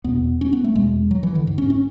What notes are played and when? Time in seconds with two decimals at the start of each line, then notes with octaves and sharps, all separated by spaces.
0.04 E2 B2 B3
0.41 C#4
0.53 B3
0.64 A3
0.75 E2 B2 G#3
1.11 F#3
1.23 E3
1.35 D3
1.47 G#2
1.58 C#4
1.70 C#4